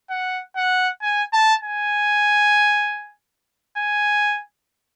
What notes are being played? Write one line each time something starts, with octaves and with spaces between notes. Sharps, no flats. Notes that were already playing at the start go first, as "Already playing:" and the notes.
F#5
F#5
G#5
A5
G#5
G#5